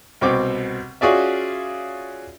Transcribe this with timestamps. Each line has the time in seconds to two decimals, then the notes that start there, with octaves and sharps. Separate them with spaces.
0.21 C2 B2 C4 D6
1.01 C#4 F4 F#4 G#4 D5 E5